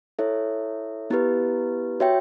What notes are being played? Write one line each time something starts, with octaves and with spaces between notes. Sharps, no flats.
E4 A4 C#5 E5
B3 E4 G4 B4
F#4 C#5 E5 G5